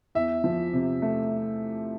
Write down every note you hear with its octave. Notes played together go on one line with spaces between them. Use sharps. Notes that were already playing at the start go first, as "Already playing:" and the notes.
E2 E5
F3
C3
A3